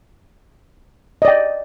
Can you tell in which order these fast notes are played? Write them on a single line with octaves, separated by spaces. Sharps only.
D#5 D5 G5